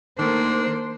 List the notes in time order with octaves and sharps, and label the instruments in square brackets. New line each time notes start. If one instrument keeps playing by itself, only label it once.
[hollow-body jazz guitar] D#3 A3 [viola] A#3 [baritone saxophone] D4 [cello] C5